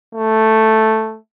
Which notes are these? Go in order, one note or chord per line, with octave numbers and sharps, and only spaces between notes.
A3